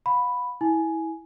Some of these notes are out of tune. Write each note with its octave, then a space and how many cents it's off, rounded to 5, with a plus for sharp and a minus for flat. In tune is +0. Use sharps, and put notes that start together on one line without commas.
F5 +40 B5 +0
E4 -20 G#5 +10